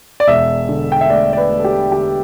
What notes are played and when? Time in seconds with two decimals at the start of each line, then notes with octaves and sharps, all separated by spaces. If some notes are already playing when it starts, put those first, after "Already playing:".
0.20 D5
0.28 E1 E5
0.69 D3
0.92 G5
1.01 E5
1.10 A3 D5
1.33 D5
1.37 B4
1.51 A3
1.59 A4
1.64 G4
1.92 D3 G4